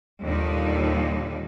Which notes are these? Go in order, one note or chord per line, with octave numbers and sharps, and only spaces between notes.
D#2 A#2 D3 D#3 G3 D#4